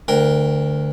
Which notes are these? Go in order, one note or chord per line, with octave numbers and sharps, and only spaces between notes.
D2 A#4 G5